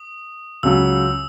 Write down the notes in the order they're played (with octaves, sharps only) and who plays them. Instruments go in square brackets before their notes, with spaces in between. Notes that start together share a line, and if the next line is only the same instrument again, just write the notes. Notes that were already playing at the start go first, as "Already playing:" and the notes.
Already playing: [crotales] D#6
[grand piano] C#2 C#3 F#3 [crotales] E6